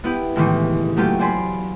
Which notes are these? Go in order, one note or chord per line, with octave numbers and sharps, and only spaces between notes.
B3 E4 G4
C#2 A2 D#3 E3
F#3 A3 A#3 C#4 F4 G4
C5 D5 G#5 B5 C6